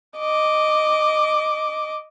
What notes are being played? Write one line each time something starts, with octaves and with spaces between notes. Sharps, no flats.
D#5 D6